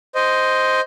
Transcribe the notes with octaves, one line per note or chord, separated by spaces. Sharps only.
C5 D#5